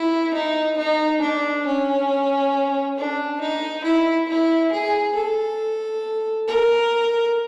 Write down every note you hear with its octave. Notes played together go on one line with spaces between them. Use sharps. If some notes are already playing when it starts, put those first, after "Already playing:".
Already playing: E4
D#4
D#4
D4
C#4
D4
D#4
E4
E4
G#4
A4
A#4